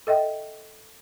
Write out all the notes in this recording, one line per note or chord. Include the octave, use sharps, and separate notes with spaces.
A4 D#5 E5 G5